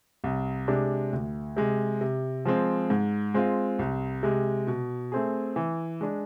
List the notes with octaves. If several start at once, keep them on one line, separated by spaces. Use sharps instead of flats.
C2
C3 G#3 D4
D2
C3 G#3
C3
F3 G#3 C4
G#2
G#3 C4 F4
C2
C3 G#3
B2
A3 C4 G#4
E3
G#3 D4